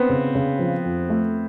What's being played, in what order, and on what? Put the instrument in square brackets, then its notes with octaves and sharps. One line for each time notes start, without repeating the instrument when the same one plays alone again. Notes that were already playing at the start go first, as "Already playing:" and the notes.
Already playing: [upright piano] B3 C4
[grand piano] C#3
C#3
F3
F2
A3